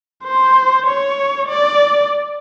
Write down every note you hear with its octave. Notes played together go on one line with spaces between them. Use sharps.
C5
C#5
D5